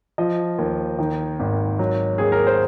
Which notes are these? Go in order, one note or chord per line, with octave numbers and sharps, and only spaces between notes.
F3 D#5
D#2
D#3
G#1
F#3
D#2 G#4
A#4
C5